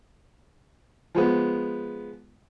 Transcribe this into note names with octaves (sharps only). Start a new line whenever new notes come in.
F3 G#3 B3